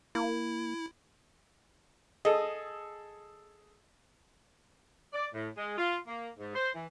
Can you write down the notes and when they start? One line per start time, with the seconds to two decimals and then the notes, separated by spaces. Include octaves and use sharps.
0.15 A#3 E4
2.25 G#4 A4 D#5
5.13 D5
5.34 A2
5.57 G#3
5.78 F4
6.07 A#3
6.38 G#2
6.55 C5
6.75 E3